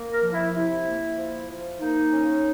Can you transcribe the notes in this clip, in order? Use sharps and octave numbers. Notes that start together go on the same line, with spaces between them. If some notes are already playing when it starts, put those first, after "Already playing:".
Already playing: A#3
A#4
F3
E4
C3 E4
A#3
F3
F3
A#3 D#4
C#4